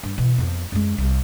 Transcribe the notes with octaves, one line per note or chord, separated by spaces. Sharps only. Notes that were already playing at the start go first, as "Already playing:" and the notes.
G2
B2 E3
F2 B3
F#2 G#3
C2